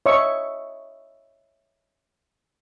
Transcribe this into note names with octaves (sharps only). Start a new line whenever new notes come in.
C#5 D#5 E5 C#6